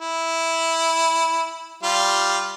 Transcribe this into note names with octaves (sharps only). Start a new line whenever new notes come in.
E4
G3 F4